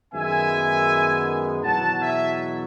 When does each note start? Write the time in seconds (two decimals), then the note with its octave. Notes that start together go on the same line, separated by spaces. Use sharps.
0.13 F#2 D#3 G#3 B3 E5 G#5
1.63 E2 B2 F#3 F#5 A5
2.01 E5 G#5